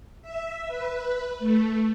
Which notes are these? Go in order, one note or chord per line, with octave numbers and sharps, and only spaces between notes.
E5
B4
A3